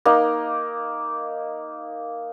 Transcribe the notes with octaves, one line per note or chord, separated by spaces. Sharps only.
A#3 D#4